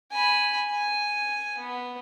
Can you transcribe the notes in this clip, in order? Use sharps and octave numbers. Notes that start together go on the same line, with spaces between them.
G#5 B5
G#5
B3